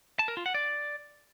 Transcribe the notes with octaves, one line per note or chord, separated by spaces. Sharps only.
A5
A#4
F4
F#5
D5